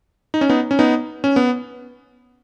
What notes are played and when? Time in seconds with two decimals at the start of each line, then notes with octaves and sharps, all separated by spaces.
0.34 D#4
0.41 C#4
0.49 B3 D#4
0.71 C#4
0.79 B3 D#4
1.24 C#4
1.36 B3